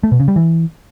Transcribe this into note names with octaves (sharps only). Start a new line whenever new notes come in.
A3
B2
C#3
G3
E3